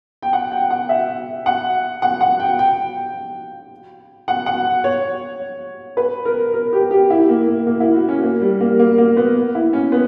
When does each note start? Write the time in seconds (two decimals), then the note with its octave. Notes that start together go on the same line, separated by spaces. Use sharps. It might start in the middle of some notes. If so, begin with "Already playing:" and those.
0.22 G5
0.33 F#5
0.52 G5
0.70 F#5
0.89 E5
1.46 F#5
2.02 F#5
2.21 F#5
2.40 G5
2.59 G5
4.28 F#5
4.46 F#5
4.84 C#5
5.97 B4
6.25 A#4
6.54 A#4
6.73 G4
6.91 G4
7.10 E4
7.29 A#3
7.47 A#3
7.67 A#3
7.80 E4
7.94 F#4
8.09 C#4
8.23 A#3
8.41 G3
8.61 A#3
8.79 A#3
8.98 A#3
9.17 B3
9.55 E4
9.73 C#4
9.92 B3